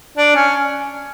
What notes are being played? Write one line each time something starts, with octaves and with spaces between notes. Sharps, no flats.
D4
C#4